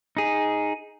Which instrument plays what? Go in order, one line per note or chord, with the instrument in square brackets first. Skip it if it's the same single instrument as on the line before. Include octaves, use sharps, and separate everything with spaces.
[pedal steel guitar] D#4 G#4